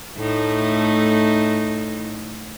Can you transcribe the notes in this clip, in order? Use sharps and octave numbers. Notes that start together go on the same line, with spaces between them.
A2 A3 D#4